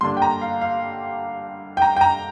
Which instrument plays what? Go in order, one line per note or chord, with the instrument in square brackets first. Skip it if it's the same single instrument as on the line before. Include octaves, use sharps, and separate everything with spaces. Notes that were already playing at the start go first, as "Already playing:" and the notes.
[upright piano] G2 D3 A#3 D4 C6
G5
A#5
F5
F5
G5
A#5
G5
A#5